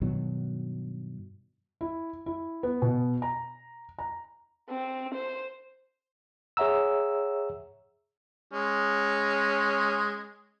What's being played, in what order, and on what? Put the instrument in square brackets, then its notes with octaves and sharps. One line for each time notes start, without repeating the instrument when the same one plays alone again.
[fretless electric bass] G2 B2 D#3 F#3
[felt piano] E4
E4
B3
B2
A#5
A#5
[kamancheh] C4
C5
[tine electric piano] G#4 C#5 E5 F#5 A#5 E6
[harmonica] G#3 C#4